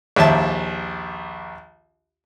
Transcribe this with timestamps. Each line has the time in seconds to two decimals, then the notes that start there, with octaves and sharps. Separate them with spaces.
0.16 A#1 D#2 E5 A5